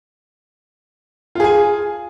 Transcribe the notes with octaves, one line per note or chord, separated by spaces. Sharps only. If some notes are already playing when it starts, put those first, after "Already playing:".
F4 G#4 G#5